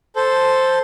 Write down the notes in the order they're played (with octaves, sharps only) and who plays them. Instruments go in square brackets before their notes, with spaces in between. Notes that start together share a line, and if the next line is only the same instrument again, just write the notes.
[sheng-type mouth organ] A4 C5